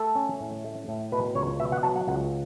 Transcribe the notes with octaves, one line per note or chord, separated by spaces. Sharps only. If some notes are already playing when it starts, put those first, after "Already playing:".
Already playing: A3 A4
C#4
A2
A3
A2
B2 B4
C#2 C#5
B2 E5
F#5
F#3 A5
F#5
C#2 F#5